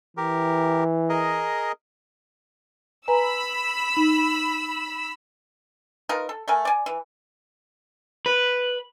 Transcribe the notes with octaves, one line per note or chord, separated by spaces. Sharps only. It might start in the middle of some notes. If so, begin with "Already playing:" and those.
E3 G4 A#4
G#4 A#4 D#5
B4 G#5 A#5 B5 E6
D#4
D#4 F4 A#4 B4
A4
A3 A#4 G#5
D5 G#5
E3
B4